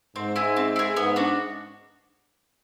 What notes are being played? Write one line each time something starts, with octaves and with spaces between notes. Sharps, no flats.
G#2 C4
E4 G#4
C4
E4 G#4
G#2 B3
D4 F#4